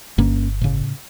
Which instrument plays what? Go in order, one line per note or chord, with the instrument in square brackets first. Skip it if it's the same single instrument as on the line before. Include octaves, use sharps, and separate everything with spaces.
[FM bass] G1 [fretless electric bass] G2 A#3 C#4
[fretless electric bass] A2 C#3